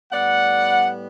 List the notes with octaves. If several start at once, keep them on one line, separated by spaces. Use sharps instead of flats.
A2 G3 B3 D5 F#5